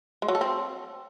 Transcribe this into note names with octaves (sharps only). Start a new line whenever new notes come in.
G#3
F#3
A4
C4